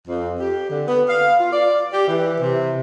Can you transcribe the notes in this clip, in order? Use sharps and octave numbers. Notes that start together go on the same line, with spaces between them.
F2
G4
D3
B3
F5
F4
D5
G4
E3
C3